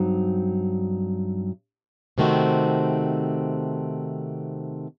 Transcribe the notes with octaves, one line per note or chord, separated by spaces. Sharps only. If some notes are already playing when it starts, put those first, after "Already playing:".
Already playing: G2 F#3 C4 D#4
C3 D#3 A3 C4 F#4